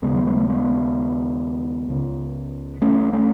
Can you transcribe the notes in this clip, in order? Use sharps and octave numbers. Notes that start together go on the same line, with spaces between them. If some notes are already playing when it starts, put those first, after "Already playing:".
D#2 C#3 G#3 B3
F#3
G#3
A3
G#3 B3
C#2 C#3
A3 C#4
A3 C#4